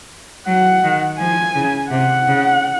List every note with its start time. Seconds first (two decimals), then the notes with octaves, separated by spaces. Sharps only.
0.46 F#3 F#5
0.84 D#3
1.19 F3 G#5
1.55 C#3
1.90 C3 F#5
2.27 C#3